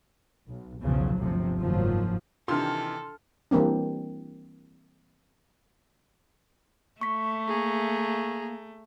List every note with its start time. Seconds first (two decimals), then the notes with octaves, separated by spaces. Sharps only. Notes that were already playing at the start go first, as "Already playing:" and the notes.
0.49 B1
0.81 B1 E2 C#3 F3 F#3
1.18 G1 D2 C3 F3
1.59 F#1 G#2 D#3 F3 F#3
2.48 C3 D#3 E3 D4 F4 A4 C6 F6
3.51 E3 G3 A#3 C4 D4
7.01 A3 C#6 B6
7.48 A#3 G#4 A#5